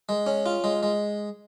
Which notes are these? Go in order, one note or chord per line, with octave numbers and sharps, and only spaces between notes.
G#3
C#4
F4
G#3
G#3